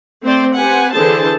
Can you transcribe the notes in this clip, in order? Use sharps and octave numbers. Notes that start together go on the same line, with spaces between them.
A3 C4 C5 D5
C4 G4 B4 F#5 G#5
D3 E3 G#4 A4 C5 A5